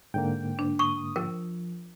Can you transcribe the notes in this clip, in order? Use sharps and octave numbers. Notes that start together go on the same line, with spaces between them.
G#2 D3 A#3 G5
D4
C#6 D#6
F3 A#4